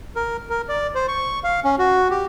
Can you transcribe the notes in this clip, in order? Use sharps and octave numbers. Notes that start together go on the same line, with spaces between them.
A#4
A#4
D5
C5
C#6
F5
C#4
F#4
G4